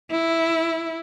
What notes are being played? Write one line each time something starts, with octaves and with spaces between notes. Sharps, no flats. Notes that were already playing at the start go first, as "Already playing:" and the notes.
E4